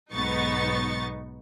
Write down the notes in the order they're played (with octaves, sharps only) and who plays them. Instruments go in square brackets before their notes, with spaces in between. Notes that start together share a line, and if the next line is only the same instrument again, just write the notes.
[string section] B1 G#2 B3 D#4 C#6 A6